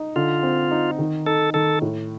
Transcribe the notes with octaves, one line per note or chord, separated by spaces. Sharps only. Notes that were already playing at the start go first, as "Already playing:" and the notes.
Already playing: D#4
D3 F4
C4
D#4
D#3
D#4 A4
D#3 A4
A2